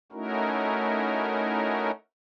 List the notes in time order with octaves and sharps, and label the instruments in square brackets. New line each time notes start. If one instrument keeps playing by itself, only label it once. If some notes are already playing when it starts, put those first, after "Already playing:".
[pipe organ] A3 C#4 D#4 E4 F#4 A#4